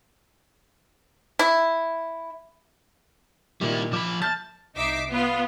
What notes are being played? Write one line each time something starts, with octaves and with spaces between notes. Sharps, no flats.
E4
A#2 D#3 G3 E4
F3 B5 D6
A5 F6 G6 A6
C2 D#4 E5 D6 C7
B3 F4